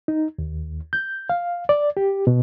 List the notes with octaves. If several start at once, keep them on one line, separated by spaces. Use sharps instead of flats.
D#4
D#2
G6
F5
D5
G4
B2